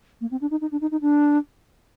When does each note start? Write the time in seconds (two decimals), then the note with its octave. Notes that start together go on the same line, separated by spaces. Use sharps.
0.21 A#3
0.31 C4
0.41 D4
0.51 D#4
0.61 D#4
0.71 D4
0.81 D#4
0.91 D#4
1.01 D4